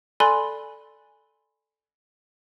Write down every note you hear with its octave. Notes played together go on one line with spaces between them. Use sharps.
A4 D5 G#5 B5 C6 F#6